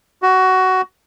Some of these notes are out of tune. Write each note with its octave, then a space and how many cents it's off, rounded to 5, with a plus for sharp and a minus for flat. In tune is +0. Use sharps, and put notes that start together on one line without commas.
F#4 +15